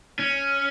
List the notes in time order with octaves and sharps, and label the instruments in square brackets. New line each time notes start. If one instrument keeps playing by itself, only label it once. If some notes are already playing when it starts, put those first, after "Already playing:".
[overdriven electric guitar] C#4